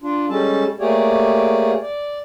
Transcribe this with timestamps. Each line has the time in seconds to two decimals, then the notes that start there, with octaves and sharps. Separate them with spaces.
0.02 D4 F4
0.29 G3 G#3 C#4 A4 A5
0.80 A3 A#3 G4 G#4 C#5 D5
1.82 D5